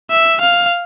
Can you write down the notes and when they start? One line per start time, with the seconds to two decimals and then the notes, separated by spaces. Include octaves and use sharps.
0.11 E5
0.41 F5